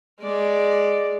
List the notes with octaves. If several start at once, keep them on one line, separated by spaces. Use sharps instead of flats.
G#3 D5